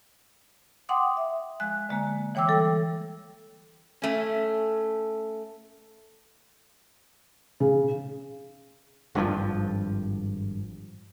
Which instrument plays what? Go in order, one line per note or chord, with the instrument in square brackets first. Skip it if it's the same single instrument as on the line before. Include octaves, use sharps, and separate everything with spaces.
[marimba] F#5 G5 C6 D6 D#6
E5
F3 G#3 F#6
D3 G#3 A#3
E3 C#5 G5 D6 E6
G3 A4
[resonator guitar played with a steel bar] A3 C#4
[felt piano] C#3
[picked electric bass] G#1 G2 D3 F3